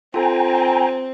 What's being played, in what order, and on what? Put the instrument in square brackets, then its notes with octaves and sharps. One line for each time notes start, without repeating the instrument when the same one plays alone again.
[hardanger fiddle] C4 [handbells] F4 A4 [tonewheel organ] G5 G#5 A#5